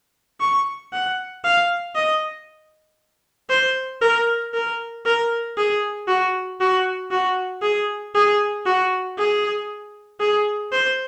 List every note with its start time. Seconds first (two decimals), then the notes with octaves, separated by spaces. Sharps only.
0.41 C#6
0.93 F#5
1.44 F5
1.95 D#5
3.50 C5
4.01 A#4
4.54 A#4
5.05 A#4
5.57 G#4
6.08 F#4
6.60 F#4
7.11 F#4
7.62 G#4
8.15 G#4
8.66 F#4
9.18 G#4
10.20 G#4
10.72 C5